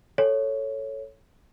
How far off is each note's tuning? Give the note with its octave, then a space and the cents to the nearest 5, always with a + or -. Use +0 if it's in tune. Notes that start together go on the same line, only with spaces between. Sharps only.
A4 +0 C#5 +0